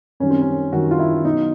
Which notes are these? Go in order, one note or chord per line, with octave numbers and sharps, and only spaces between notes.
F#2 D#3 G3 C#4
C4
C#4
F#2 D#3 G3 F#4
F4
E4
B2 F#3 D#4